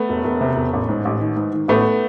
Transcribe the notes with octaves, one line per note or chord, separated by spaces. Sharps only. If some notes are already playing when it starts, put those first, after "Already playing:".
Already playing: A3 B3
E1
E1
C3
E1
A1
G#2
A1
D#3
G#2
D#3
A1 A3 B3